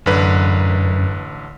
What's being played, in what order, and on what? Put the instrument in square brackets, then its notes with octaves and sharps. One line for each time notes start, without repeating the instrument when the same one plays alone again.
[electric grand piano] A1 D3 B4 [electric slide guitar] F#2